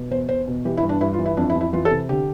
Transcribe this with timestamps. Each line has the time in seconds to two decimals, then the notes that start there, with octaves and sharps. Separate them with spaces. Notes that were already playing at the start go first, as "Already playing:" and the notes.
Already playing: B2
0.11 E2 C5
0.29 E2 C5
0.48 B2
0.65 E3 G4
0.77 E4
0.83 G2
0.89 D4
1.01 G2 E4
1.13 F4
1.19 E3
1.26 E4
1.37 F2 D4
1.50 E4
1.56 F2
1.61 E4
1.73 E3 F4
1.85 A4
1.91 C3
2.09 D3 G4